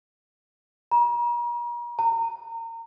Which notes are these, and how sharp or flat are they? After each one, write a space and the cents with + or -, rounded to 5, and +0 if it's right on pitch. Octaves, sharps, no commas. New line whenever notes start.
A#5 +40
A#5 -30